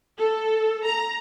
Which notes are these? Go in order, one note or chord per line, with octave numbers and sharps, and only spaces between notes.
A4
A#5